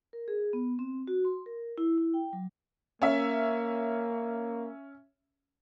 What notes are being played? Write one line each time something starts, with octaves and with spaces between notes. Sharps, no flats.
A#4
G#4
B3
C4
F#4
C6
A#4
E4
E4
G5
F#3
A#3 C#4 E5